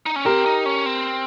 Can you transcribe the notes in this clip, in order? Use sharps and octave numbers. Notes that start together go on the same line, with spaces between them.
D#4
C#4
C4 G4 A#4
D#4
C#4
C4